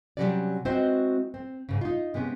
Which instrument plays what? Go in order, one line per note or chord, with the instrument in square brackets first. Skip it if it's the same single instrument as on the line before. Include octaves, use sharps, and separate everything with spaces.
[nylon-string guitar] C3 D#3 F#3 G3 C#4 D5
G#3 C4 E4 F#4 B4 C5
C4
G#2 C#3
D#4 F4
C3 G#3 B3 C#4